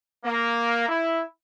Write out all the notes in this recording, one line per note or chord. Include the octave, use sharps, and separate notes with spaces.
A#3
E4